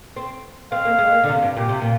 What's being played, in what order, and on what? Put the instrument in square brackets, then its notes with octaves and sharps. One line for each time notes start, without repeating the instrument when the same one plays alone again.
[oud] C4
[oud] C4 [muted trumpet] F5
[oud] A#3
G#3
A#3
D3
C3
G2
[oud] A#2 [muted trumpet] G4
[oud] C3
A#2